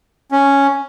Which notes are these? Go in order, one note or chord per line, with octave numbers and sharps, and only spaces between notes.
C#4